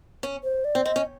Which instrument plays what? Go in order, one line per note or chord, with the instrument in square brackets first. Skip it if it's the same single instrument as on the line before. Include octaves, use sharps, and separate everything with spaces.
[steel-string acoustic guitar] C#4
[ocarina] C5
D5
[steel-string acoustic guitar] C4
[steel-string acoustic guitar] C4 [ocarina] D#5
[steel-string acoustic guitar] C#4